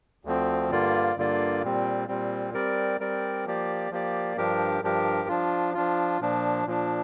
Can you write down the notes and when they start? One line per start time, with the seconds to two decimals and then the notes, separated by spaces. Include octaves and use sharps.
0.25 D2 D3 F3 C4
0.71 G2 D3 A#3 F4 D5
1.17 G2 D3 A#3 F4 D5
1.62 A#2 G3 C4
2.08 A#2 G3 C4
2.54 G3 C4 A#4 D5
3.00 G3 C4 A#4 D5
3.46 F3 A#3 G4 D5
3.91 F3 A#3 G4 D5
4.37 G2 F3 D4 G4 A#4
4.83 G2 F3 D4 G4 A#4
5.29 F3 D4 F4
5.74 F3 D4 F4
6.20 A#2 F3 D4
6.66 A#2 F3 D4